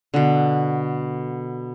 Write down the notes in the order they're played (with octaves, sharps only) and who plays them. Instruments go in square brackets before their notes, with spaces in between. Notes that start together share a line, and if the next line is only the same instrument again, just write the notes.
[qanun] B2 D3